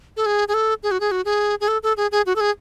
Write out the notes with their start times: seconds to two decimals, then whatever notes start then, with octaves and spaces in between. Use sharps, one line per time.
0.17 A4
0.26 G#4
0.48 G#4
0.54 A4
0.83 G#4
0.91 F#4
1.00 G#4
1.11 F#4
1.25 G#4
1.61 G#4
1.68 A4
1.83 A4
1.97 G#4
2.12 G#4
2.26 F#4
2.36 A4
2.41 G#4